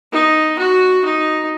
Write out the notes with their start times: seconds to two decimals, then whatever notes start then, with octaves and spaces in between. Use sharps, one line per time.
0.12 D#4
0.58 F#4
1.05 D#4